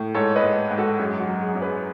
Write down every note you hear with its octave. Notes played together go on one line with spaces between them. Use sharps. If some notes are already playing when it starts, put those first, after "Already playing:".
Already playing: A2
G#2 A4 C#5
B4 D#5
G#2
G#2
F#4 A4
F#2 G#4
F#4
F#3
G#4
F#2
G#4 B4